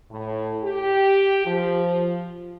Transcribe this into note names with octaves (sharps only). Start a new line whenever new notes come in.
A2
G4
F3